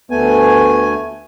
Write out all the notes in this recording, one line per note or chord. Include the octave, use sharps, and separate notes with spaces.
D2 A3 B3 G#5